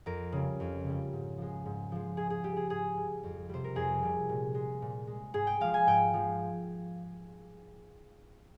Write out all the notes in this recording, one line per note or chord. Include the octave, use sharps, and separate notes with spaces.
F2 A#4
C#3 G3
F2
C#3 G3
G#2
F3 G#3
G#2
F3 G#3
G#2 G#4
G#4
G3 G4
G#4
G#2 G#4
G3
F2
C3 G3 C5
A#4
F2 G#4
C3 G3
A#2
G#3
A#2
G#3
G#2 G#4
G5
F3 G#3 F5
G#5
G#2 G5
F3 G#3